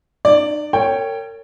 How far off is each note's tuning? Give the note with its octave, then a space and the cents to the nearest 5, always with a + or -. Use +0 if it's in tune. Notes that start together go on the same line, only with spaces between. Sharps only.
D#4 -45 D5 +0
A#4 -40 C#5 +0 G5 +5